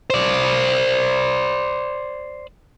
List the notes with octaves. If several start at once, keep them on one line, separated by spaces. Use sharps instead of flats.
C5 D5